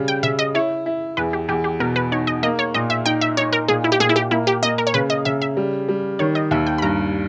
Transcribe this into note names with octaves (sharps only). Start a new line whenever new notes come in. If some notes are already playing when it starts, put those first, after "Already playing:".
Already playing: C#3 G3
G5
C#3 E5
D#5
E4 C#5
E4
E2 B4
G4
E2 G4
G4
B2 A#4
B4
D#4 C#5
D#5
A#3 D#5
C#5
A#2 D#5
E5
D#4 G5
E5
D#4 C#5
A#4
A#2 G#4
E4
G4
A#2 G#4
E4
G4
A#3 E4
G4
A#3 D#5
A#4
C#5
C#3 B4
D#5
C#3 E5
E5
G3
G3
D#3 C#5
D#5
D#2 E5
G5
B5
G2 A#5